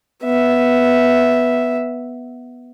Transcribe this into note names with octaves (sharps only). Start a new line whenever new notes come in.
B3 E5